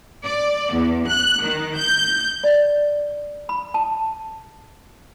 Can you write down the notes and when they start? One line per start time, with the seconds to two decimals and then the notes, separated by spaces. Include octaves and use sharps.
0.24 D5
0.73 E2
1.08 F#6
1.43 D#3
1.77 G6
2.44 D5
3.49 B5
3.74 A5